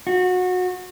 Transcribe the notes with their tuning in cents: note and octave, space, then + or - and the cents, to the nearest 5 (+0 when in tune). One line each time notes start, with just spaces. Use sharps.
F#4 -25